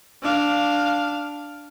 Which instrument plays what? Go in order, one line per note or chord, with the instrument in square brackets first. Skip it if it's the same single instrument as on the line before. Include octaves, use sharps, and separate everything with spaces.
[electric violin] D4 F5